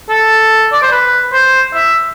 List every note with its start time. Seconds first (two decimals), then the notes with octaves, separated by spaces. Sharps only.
0.09 A4
0.73 D5
0.83 C5
0.92 B4
1.33 C5
1.74 E5